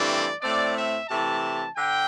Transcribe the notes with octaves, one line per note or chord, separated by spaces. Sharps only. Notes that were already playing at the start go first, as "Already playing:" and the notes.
Already playing: G2 E3 A3 C4 D5
A2 A3 C4 D5
E5
C3 E3 A3 A5
D3 G5